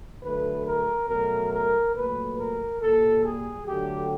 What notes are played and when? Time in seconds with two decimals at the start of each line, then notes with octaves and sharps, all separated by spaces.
0.22 D3 F#3 A3 B4
0.65 A#4
1.08 B2 F#3 A3 A#4
1.51 A#4
1.95 A#2 F#3 A3 B4
2.38 A#4
2.81 A#2 G3 A4
3.25 G#4
3.67 D3 F#3 A3 G4